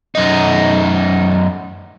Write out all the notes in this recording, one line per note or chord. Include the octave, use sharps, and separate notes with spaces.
F#2 D#4